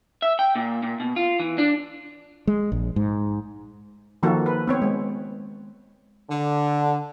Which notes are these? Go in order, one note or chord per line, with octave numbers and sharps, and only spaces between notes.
E5
G5
A#2
A#2
B2
F4
E3
D4
G#3
A#1
G#2
D#3 F3 A#3 F#4 A4
B4
B3 C4 C#5
G#3
D3